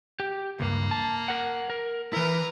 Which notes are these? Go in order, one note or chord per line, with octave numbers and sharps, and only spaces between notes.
G4
C#2 G2 A#3
A5
A#4 F#5
A#4
E3 E4 A#4 B4